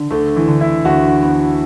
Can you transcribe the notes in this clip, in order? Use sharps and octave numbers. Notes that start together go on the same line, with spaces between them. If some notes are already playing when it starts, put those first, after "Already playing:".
Already playing: D3
D2 A3
E3
D3
E4
D2 F#4
B3